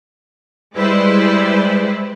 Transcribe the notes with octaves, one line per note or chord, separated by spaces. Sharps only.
G3 G#3 E4 B4 C5 D5